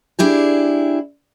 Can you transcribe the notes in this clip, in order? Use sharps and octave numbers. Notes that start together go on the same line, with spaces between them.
D4 E4 G4 G#4